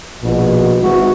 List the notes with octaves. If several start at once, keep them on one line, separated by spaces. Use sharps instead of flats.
A#1 B2
G#1 G#2 E3 F#4